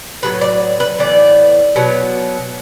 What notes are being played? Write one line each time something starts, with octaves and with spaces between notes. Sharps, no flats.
A2 F#3 B3 B4
D5
B4
A2 E3 B3 D5
B2 F#3 B3